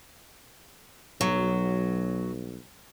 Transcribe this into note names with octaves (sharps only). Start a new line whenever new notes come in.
B1 F#3